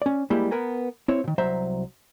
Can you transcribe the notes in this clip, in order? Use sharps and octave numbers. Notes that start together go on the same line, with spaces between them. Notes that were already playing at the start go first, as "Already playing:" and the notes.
C#4 D5
G3 G#3 A#3 E4 G4 G#4
B3 A#4 B4 G#5 A#5
C4 E4 C#5
A#2 D#3
C2 F#3 C5 E5 A#5